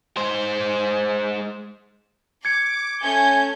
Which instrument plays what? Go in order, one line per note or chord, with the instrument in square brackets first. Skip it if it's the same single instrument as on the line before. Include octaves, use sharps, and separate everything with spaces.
[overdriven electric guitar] G#3 C5
[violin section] D6 [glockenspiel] G#6 C#7
[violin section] A3 C#4 G6 [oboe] G#5